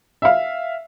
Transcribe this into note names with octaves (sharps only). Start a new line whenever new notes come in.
E5 F5